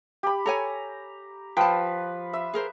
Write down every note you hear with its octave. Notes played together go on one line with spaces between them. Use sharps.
G4 B5
A4 C#5 G#5 A#5
F3 B4 G5 A5
E5
G#4 A#4 C5